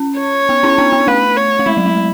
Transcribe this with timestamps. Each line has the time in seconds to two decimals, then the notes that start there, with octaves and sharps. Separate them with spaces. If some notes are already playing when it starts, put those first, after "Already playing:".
Already playing: C#4
0.19 C#5
0.49 B3
0.63 C#4 E4
0.78 B3 D4
0.93 B3
1.07 A3 B4
1.37 C#5
1.59 A3
1.66 G#3 E4
1.77 F#3
1.86 G#3